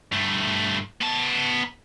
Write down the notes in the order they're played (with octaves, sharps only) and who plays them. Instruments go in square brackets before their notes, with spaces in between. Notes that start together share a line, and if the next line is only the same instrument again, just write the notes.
[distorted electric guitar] G2 A3
B3 A5